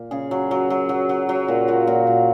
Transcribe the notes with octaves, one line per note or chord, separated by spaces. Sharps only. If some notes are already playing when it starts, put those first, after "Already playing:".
Already playing: A#2
C#3 G#4
F#3
F#3
F#3
F#3
F#3
F#3
A#2
A#2 F#4
A#2
A#2